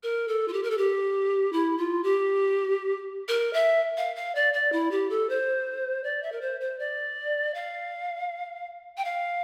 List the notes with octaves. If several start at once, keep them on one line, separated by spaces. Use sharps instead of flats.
A#4
A4
F4
G4
A#4
A4
G4
E4
F4
G4
A#4
E5
F5
F5
D5
D5
E4
G4
A4
C5
D5
E5
A#4
C5
C5
D5
F5
G5
F5